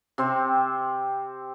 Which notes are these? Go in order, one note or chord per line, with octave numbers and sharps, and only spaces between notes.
C3 C4 C5